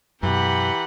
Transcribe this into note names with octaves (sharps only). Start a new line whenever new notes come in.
F#2 B2 E3 G4 F#5 A#5 B5